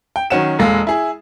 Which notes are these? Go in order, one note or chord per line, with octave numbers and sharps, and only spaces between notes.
G5
D#3 F#3 C#4 F#5 E7
E1 A#2 G#3 A4 F5
E4 G#4